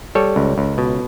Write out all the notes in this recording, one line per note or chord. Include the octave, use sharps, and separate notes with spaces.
G3 A4 C#5
C#2
C#2
B2